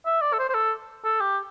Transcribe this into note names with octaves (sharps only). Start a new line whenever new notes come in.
E5
D5
A4
C5
C5
A4
A4
G4